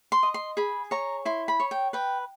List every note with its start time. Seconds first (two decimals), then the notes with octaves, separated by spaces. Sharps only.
0.12 C6
0.23 D#5
0.34 C6
0.57 G#4 B5
0.91 C#5 A#5
1.25 E4 C6
1.48 B5
1.60 C#5
1.71 G5
1.93 B4 G5